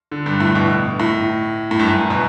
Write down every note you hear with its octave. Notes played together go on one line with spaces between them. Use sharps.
D3
G2
A2
B2
A2
A2
G2
F#2
B2